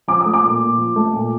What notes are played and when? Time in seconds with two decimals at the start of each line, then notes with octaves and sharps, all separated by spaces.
0.08 F3 D6
0.21 A3 D#6
0.34 D6
0.43 A#2
0.61 A#2
0.78 F3
0.96 A3
1.13 A#2